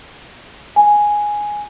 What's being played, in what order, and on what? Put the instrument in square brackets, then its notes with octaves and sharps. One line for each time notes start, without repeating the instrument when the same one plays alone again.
[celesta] G#5